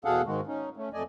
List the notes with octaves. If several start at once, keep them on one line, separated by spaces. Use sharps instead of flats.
E2 B2 G#4 A4 F5 F#5
G#2 D#3 G#3 F#4
C#4 D#4
A3 C#4
F2 A3 D5 D#5 G#5